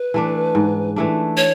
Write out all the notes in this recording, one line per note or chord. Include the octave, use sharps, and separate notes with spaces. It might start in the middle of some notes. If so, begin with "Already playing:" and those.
Already playing: B4
E3 A3 D4
G#2
E3 A3 D4
C#5